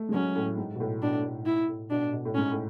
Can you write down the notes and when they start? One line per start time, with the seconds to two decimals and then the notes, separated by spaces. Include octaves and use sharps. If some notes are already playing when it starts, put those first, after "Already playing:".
Already playing: A3
0.09 G#3
0.13 F#3 C#4
0.36 A2
0.58 G#2
0.75 B2
0.80 A2
1.02 B2 D4
1.24 A2
1.46 E4
1.68 A2
1.90 B2 D4
2.13 B2
2.25 A2
2.35 G#2 C#4
2.51 A2